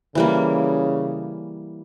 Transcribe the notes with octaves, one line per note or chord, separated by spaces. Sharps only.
C#3 E3 G3 A#3